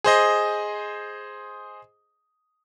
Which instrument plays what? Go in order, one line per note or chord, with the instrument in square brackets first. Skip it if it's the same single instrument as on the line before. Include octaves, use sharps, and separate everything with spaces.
[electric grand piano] G#4 C5 D#5